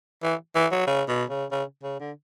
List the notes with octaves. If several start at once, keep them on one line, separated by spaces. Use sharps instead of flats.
E3
E3
F#3
C#3
B2
C#3
C#3
C#3
D3